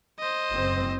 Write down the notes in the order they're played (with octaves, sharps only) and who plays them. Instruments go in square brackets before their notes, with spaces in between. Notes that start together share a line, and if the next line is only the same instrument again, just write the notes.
[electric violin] C5 D#5
[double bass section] F#1 C4